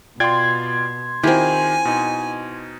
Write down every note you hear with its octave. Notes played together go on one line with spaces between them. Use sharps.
B2 F4 D5 G5 C6 G#6
D#3 C4 E4 F4 G4 G#5
B2 D#4